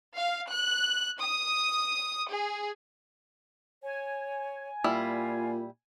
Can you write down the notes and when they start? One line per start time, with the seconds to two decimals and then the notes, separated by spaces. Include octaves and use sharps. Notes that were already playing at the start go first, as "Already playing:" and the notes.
0.15 F5
0.49 F#6
1.21 D#6
2.31 G#4
3.83 C#5 G#5
4.84 A#2 G3 E4 F4